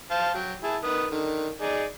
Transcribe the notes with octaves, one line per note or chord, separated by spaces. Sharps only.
C5 F5 A5
F#3 G5
E4 G#4 A5
D#3 B4 D#6
D3 D#3
D#4 G#4 D5